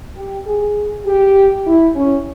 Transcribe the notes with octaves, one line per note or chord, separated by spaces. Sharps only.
G4
G#4
G4
E4
C#4